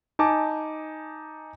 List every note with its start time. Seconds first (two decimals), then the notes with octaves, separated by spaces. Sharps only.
0.19 D#4 G#5 A5 D6